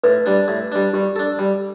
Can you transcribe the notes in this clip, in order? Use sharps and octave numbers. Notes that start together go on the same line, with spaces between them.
A2 B4
G3 D4
A2
G3 D4
G3 G4
D4 A4
G3